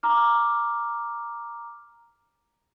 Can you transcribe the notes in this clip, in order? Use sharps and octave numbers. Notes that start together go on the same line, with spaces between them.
A#5 D6 F6